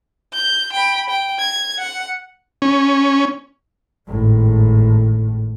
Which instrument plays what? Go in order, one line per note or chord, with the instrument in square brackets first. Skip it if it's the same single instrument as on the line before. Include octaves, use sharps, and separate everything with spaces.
[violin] G6
G5 B5
G5
G#6
F#5
[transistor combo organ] C#4
[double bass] G#1 A2